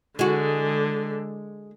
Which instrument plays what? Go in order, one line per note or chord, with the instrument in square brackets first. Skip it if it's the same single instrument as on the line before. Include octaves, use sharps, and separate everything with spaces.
[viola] D3 [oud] G#3 F#4